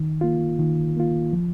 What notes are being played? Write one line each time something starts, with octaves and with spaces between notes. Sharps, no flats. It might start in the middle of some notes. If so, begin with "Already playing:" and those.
Already playing: D#3
A#3 F4
D#3
A#3 F4
F3